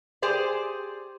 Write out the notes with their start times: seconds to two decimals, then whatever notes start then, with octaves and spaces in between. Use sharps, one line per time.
0.22 G4 G#4 C5 D5